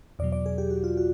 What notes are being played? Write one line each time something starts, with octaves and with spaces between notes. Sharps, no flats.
E2 B2 F#3 D5
D5
G#4
G4
F#4
F4
F#4